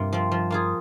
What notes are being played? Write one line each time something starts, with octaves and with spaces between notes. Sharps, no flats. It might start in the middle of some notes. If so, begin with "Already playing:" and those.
Already playing: G2 C3 A#3 F4
F3 C4
F3
A#3 F4 G#4